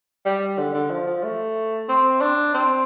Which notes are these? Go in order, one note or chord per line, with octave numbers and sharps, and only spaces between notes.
G3
D3
D3
F3
F3
A3
C4
D4
C4